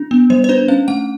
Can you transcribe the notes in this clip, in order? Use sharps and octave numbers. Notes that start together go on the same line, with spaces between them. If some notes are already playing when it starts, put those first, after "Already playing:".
Already playing: D4
B3
G3 C5
C5
D4 B4
C#4 F5
A3 F#5